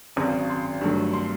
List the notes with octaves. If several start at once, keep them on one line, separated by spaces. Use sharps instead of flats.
G#1 F#2 C#3
C6
G2 D#3 F#3 A3
C6